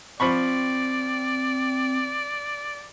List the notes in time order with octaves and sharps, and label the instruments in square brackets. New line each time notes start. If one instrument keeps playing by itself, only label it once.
[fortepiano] F3 B5 C#6 [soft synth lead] C4 [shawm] D5